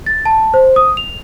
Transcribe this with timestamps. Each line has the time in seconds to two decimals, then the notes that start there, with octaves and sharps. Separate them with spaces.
0.06 A6
0.26 A5
0.54 C5
0.76 D#6
0.97 F7